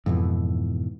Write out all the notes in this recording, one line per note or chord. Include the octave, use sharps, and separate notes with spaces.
F2 G#2 B2 E3